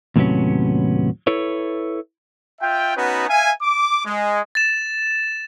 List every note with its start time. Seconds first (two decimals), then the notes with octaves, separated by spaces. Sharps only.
0.16 D#2 A2 C3 F#3 B3 C#4
1.27 E4 A4 B4 C#5
2.61 F4 E5 G5
2.96 B3 C#4 D#4 F#4 B4
3.29 E5 F5 G#5
3.62 D6
4.05 G#3
4.55 A6 E7